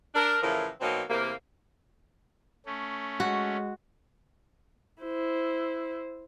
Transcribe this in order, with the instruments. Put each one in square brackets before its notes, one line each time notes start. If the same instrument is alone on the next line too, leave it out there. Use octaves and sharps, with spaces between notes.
[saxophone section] D4 A#4
A2 C#3 E3 F3 A#4
B2 F#3 A#3 C4 D#4
E2 C3 A#3
[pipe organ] A3 C#4
[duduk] G#3 [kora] F#4
[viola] E4 C5